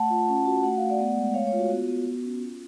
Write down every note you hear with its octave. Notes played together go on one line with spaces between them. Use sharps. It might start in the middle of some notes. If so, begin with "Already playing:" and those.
Already playing: A3 F#5 A5
F4
C#4
F#4
A3 F#5
A3 F5
D5 F#5
B3
G#3
A3 C#5 F5
C#5 F5
F4
F#4
B3 F#4
B3
F#4
C#4
F4